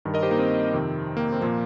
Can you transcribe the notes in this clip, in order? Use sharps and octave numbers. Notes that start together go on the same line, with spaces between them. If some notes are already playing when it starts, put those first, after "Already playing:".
G2 D#3
A#4 D#5
G4 C5
A#3 D#4
C4
F2 C3 D#3
A#3
C4
A#2 F3 A#3